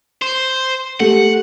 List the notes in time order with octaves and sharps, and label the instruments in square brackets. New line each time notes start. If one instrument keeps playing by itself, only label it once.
[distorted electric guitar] C5
[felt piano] A3 [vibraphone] G4 [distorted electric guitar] F#5